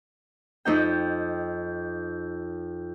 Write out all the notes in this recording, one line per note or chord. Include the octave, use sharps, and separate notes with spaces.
F2 D#4 G5